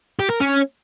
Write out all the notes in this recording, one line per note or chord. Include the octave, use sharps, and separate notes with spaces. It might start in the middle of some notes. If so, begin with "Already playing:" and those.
G4
A#4
C#4